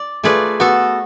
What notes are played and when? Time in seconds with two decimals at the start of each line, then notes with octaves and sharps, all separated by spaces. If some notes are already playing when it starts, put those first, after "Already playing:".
Already playing: D5
0.24 A3 F4 G#4 B4 D5
0.60 B3 F#4 A4